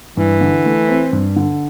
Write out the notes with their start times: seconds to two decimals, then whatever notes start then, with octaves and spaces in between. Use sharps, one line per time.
0.16 G2 E3
0.41 D3
0.65 A3
0.88 C4
1.13 G2
1.36 D3